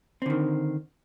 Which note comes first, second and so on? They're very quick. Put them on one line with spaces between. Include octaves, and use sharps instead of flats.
C4 D3 D#3